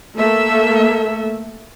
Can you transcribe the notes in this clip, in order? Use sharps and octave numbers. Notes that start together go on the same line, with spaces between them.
A3 A#3 A4 E5